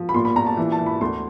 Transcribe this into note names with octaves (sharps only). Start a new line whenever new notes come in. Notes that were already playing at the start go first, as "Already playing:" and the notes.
Already playing: F3
B5
A#2 C6
B5
A#2 A#5
A5
E3
A5
E3
B5
D2 C6